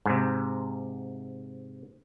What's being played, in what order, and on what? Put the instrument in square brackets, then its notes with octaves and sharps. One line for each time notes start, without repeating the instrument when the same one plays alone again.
[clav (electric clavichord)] G#2 C3